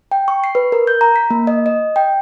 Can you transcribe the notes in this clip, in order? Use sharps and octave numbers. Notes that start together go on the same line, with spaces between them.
G5
C#6
C7
B4
A#4
G6
A#5
B6
A#3
D#5
D#5
G5